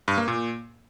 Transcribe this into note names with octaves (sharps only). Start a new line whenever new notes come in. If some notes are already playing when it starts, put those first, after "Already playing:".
G2
A#3
A#2